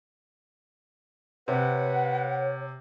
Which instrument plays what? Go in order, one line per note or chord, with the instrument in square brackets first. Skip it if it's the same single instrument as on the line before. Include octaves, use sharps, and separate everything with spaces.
[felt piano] C3 [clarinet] B4 [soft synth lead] C#5 [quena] F#5